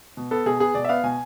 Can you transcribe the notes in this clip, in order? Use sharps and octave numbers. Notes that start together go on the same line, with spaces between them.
B2
B3 A4
B2 G#4
B3 G#4
B2 D5
E5
B3 F5
B2 G#5